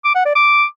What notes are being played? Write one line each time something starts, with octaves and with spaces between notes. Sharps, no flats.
D6
F#5
D5
D6